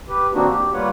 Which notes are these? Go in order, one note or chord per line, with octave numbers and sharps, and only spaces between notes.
G4 B4
D#3 A#3 C4 D4 D#4 F#4
G4
G3 A#3 F4 B4 C#5 F#5